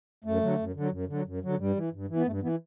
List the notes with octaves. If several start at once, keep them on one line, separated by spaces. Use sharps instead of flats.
F#2 A3
D3 F#3
F#2
D3
F#3
F#2
D3 F#3
F#2
D3 F#3
G2 G3
E3
G2
E3
B3
G2 A3
E3 B3